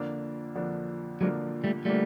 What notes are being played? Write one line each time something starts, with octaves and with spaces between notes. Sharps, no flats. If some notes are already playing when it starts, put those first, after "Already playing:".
Already playing: F2 D3 F3 A#3 D4
F2 D3 F3 A#3 D4
F2 D3 F3 F#3 G#3 A#3 D4
G3 A3
D3 F3 G3 A3 A#3 D4